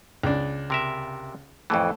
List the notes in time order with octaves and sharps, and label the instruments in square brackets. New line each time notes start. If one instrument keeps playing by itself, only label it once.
[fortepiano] C#2 D4
[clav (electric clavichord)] C3 A#4 E5
[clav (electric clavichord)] F2 A2 E3 [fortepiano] A3